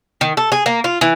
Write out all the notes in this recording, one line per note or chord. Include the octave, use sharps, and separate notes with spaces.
D#3
A4
G#4
A#3
F4
E3